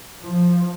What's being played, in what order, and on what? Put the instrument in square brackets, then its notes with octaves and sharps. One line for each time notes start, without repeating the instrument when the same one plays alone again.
[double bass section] F3